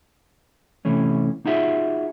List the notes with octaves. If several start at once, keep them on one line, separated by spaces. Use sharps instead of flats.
C3 E3 A3 C#4
D#4 F4 F#4 G#4 E5